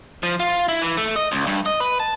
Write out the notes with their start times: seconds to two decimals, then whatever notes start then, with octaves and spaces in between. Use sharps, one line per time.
0.23 F3
0.40 F4
0.68 E4
0.82 E3
0.97 A3
1.16 D#5
1.32 C#2
1.47 G2
1.66 D#5
1.80 B4
2.00 A5